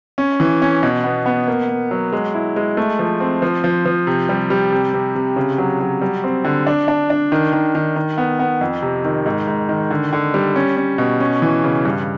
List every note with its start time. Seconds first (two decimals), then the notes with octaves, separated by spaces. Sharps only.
0.18 C#4
0.40 E3
0.62 C#4
0.83 B2
1.04 B3
1.26 B3
1.48 A#3
1.69 A#3
1.91 F#3
2.13 G#3
2.34 E4
2.56 G#3
2.77 A3
2.99 F3
3.20 C4
3.42 F3
3.64 F3
3.85 F3
4.07 C3
4.29 G3
4.50 G3
4.72 C3
4.94 C3
5.15 C3
5.36 C#3
5.58 F#3
5.80 F#3
6.02 G3
6.24 C4
6.45 D3
6.67 D4
6.88 D4
7.10 D4
7.32 D#3
7.53 D#3
7.75 D#3
7.96 D#3
8.18 B3
8.39 B3
8.61 F2
8.82 C3
9.05 D#3
9.26 G#2
9.47 G#2
9.69 D#3
9.90 D3
10.13 D3
10.34 G3
10.56 C#4
10.77 C#4
10.98 B2
11.20 C#4
11.42 E3
11.64 C#3
11.85 G2